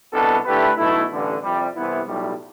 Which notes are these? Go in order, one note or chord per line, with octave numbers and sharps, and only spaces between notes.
C2 B2 B3 D4 A4
D3 A3 E4 G4 B4
B1 B2 A3 E4
A1 G2 D3
F2 C3 G3
C2 C3 E3 B3 E4
B1 A2 G3